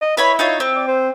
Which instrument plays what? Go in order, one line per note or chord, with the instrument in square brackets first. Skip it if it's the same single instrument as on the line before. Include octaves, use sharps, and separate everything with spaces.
[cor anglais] D#5
[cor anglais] E4 [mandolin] B4 C#5 B5
[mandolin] D#4 F4 C#5
C4
[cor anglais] D5
C5